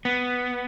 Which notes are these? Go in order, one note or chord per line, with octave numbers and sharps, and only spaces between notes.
B3